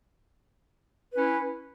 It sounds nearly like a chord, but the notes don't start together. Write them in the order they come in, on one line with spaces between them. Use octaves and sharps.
B4 C#4 E4